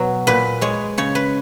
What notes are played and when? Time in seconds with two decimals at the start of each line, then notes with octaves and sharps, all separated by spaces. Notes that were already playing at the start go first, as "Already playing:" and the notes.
Already playing: B2 F#3 B4
0.27 A#2 B4
0.61 G#3 C#5
0.98 C#3 C#5
1.15 B4